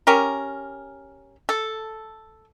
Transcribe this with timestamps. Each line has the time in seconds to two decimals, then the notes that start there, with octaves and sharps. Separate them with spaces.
0.07 C#4 G4 A#4
1.49 A4